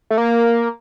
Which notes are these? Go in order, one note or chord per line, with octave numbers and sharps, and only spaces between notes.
A3
A#3